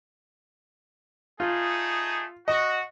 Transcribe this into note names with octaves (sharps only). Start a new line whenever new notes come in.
A3 D#4 F4 G#4
F#4 D#5